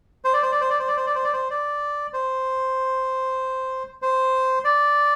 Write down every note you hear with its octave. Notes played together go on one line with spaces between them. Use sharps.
C5
D5
C5
D5
C5
D5
C5
D5
C5
D5
C5
D5
C5
D5
C5
C5
D5